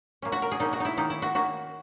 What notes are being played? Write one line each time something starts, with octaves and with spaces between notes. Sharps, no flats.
B2 A#3 C#4
F#4
A#4
G#4
B2 A#3 C#4 D#4
F#4
D#4 E4
D#3 A#3 C#4 D#4
E4
F#4
D#3 A#3 C#4 F#4